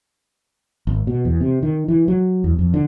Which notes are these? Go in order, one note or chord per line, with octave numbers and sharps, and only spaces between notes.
G#1
B2
E2
C3
D#3
E3
F#3
E2
F2
D3